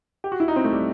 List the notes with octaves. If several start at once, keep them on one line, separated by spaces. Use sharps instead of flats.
G4
F#4
E4
D#4
C4
A3
G3